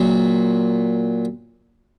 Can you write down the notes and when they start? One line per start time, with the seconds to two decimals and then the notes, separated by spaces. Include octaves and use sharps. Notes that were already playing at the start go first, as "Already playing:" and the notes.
Already playing: A#2 F#3